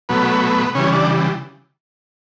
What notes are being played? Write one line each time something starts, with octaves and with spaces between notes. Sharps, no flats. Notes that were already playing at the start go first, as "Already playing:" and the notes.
B2 F#3 A3 B3 B4
C#3 E3 G3 C#4 C#5
D4 D5